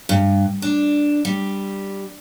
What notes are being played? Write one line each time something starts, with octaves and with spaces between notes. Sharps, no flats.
G2
D4
G3